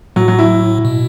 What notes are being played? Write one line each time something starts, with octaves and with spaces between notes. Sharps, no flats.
A2 F#3
F#3
E4
B2